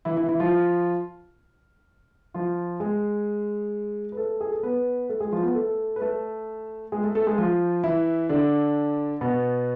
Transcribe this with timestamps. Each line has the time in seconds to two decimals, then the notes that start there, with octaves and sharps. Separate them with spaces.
0.05 E3 E4
0.17 E3 E4
0.29 E3 E4
0.40 F3 F4
2.34 F3 F4
2.80 G#3 G#4
4.12 B4
4.17 A3 A4
4.41 G#4
4.52 A4
4.63 B3 B4
5.09 A3 A4
5.20 G#3 G#4
5.32 F3 F4
5.43 B3 B4
5.55 A3 A4
5.96 B4
6.01 A3 A4
6.92 G#3 G#4
7.04 A3 A4
7.15 A3 A4
7.27 G#3 G#4
7.38 F3 F4
7.84 E3 E4
8.29 D3 D4
9.21 B2 B3